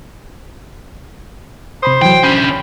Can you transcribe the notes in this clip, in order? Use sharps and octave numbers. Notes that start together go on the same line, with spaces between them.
C3 C5 B5 D#6
E3 F#3 G5
D3 C#4 B5 G6